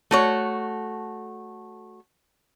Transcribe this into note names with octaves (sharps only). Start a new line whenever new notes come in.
A3 F#4 C#5